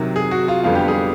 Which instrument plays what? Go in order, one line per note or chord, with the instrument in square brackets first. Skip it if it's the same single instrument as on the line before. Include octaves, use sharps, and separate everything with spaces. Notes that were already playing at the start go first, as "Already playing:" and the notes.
Already playing: [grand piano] C3 D#3 F#3 A#4
G#4
F#4
F4
F2 D3 G3 B3 F4
G4
G#4